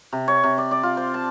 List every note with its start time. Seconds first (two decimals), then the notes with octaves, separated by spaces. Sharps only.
0.13 C3
0.28 C#5
0.44 C3
0.58 D5
0.71 D5
0.83 F4
0.97 C5
1.14 A5